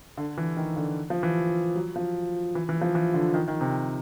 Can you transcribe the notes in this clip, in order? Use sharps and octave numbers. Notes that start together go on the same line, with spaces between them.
D3
E3
D#3
D3
F3
E3
F#3
F3
E3
E3
F3
E3
D3
D#3
D#3
C3